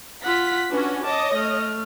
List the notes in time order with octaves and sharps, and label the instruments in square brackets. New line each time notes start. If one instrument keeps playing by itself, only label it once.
[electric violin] F4 F#5 [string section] B6
[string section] C#4 F#4 B4 [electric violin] D4
[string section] C#5 D#5 [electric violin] A5 D6
[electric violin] A3 F6